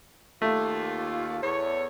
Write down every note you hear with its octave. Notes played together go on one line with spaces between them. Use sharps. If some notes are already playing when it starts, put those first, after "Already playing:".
D#2 A3 A#3 F4
E2 C#5